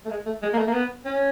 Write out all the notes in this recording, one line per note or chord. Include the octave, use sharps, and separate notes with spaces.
A3
G#3
A3
G#3
A#3
A3
A#3
B3
C#4